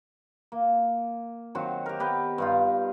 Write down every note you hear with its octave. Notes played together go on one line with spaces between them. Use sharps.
A#3
D#3 F#3 C4 F#4
G4 A#4
B3 G4 B4
G2 D#4 F4